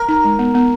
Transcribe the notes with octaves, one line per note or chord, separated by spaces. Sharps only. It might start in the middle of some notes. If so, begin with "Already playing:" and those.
Already playing: A#4
D#4
G#3
B3
B3